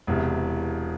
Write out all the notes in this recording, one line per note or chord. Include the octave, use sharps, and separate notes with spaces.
E1 E2 C3